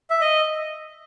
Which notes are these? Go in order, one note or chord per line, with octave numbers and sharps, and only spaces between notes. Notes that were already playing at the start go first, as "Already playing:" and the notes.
E5
D#5